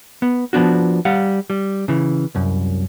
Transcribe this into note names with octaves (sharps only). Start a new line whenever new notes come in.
B3
F3 B3 D4 F#4
G3 F5 F#5
G3
C#3 E3
C2 F#2